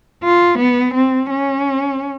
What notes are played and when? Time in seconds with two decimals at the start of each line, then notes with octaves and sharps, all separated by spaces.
0.23 F4
0.58 B3
0.94 C4
1.30 C#4